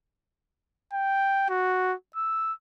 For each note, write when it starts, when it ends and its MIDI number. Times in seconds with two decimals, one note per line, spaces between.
0.93 1.45 79
1.49 1.94 66
2.16 2.53 88